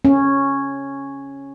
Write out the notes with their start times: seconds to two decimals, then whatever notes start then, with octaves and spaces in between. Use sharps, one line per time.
0.05 C#4